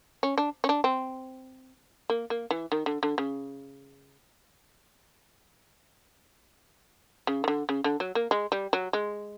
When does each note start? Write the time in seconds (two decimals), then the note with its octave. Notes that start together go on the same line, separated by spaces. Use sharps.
0.23 C#4
0.38 D4
0.64 C#4
0.69 D4
0.84 C4
2.10 A#3
2.30 A#3
2.51 E3
2.72 D#3
2.86 D3
3.03 D3
3.18 C#3
7.27 C#3
7.44 D#3
7.48 D3
7.69 C#3
7.84 D3
8.00 F#3
8.15 A#3
8.31 G#3
8.52 G3
8.73 F#3
8.93 G#3